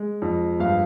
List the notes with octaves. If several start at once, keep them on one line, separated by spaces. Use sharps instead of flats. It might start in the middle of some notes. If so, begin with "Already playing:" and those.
Already playing: G#3
F2
G2 F5